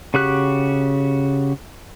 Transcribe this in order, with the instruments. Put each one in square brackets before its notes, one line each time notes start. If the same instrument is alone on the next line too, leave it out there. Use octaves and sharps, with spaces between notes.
[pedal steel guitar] C#3 F#4 G4 F#6